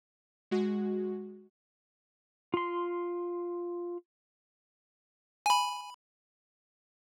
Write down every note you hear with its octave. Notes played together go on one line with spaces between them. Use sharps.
G#3 F#4
F4 C6
G#5 B5